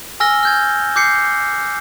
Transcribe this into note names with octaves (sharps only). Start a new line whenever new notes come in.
G#5 E6 F6 A#6 G7
F6 G6 G#6
D6 G6 C7 C#7